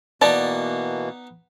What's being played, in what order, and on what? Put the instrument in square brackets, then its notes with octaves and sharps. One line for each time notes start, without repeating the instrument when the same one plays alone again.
[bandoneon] B2 E3 A#3 [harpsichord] B3 D#4 [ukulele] D5 [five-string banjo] A5